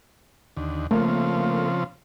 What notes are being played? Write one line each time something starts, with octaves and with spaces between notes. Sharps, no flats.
D#2 D3
C#3 F3 A3 A#3 C4